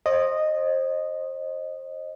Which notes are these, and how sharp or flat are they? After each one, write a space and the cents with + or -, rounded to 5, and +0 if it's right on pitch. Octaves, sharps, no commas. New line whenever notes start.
C5 +30 D#5 -10